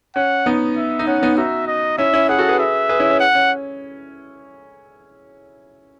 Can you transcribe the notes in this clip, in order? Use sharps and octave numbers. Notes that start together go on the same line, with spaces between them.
C#4 F#5
B3 D#4
E5
D#4
C#4 F#5
B3 D#4
D#4 F#4 E5
D#5
C#4 E4 E5
C#4 E4
E4 G#4 F#5
F#4 A4
G#4 B4
E5
G#4 B4
C#4 E4
C#4
F#5
C#4